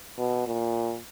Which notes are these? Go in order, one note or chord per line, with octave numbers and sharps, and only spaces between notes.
B2
A#2